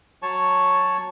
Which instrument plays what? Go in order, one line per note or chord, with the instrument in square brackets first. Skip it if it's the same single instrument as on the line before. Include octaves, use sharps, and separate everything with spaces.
[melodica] F#3 C#5 A5 C#6